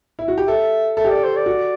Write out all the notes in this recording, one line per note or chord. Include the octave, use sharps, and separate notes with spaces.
E4
F#4
G4
A4 E5
A4 E5
G4
A4 D5
C5
D5
F#4